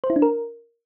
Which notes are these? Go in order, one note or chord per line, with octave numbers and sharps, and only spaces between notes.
C5
E4
D4
A#4